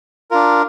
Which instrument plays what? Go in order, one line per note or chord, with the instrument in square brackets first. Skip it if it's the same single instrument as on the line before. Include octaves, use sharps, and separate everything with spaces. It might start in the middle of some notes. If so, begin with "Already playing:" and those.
[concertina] D4 F4 A#4